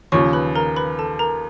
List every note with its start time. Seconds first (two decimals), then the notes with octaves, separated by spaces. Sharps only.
0.12 D#2 C#3 F3 C#5 C#6
0.33 B4 B5
0.55 A#4 A#5
0.76 B4 B5
0.99 A4 A5
1.19 A#4 A#5